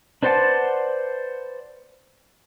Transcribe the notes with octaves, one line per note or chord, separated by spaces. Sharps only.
D4 B4 C5 D5 F#5 A5